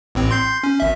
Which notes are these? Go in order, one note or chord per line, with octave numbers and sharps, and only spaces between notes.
A1 A2 C4
C6 G6 C7
C#4
G#1 E5